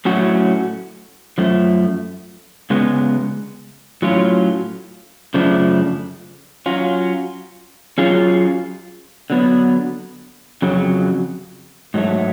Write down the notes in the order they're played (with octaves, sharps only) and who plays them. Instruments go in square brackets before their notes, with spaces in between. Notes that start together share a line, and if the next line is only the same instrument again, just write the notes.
[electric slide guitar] A2 F#3 A3 C#4 F#4
F#2 F3 A3
C#3 G#3 B3
A2 F#3 C#4 F4
F#2 C#3 F3 A3 D4
F#3 C#4 F4
F#3 C#4 F4 G#4
D3 F#3 B3
F2 C#3 F#3
G#2 F#3 A3